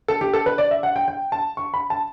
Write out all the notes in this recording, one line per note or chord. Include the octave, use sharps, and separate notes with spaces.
A4
G4
A4
B4
D5
E5
F#5
G5
G5
A5
C#6
B5
A5